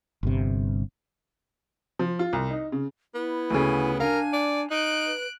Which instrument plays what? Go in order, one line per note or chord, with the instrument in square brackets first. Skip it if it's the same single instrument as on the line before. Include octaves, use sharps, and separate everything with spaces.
[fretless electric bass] G1 G2 C3
[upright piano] F3
F4
C2
D#4
C#3
[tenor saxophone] B3 [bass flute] E4
[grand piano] D2 C#3 [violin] G#5
[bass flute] D4 [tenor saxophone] A#4 [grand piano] F5 [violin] G#5
[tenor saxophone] D5
[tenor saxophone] D#4 [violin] F#6 D7
[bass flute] B4